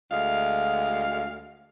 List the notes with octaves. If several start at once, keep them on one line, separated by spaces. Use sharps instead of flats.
D2 G#3 F5